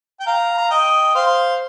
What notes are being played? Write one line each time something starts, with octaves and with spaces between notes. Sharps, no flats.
G5
F5 A#5
A#5
D#5 G5
C5 F5